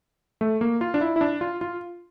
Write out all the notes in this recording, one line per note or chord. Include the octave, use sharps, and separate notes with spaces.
A3
A#3
F4
D4
E4
E4
D4
F4
F4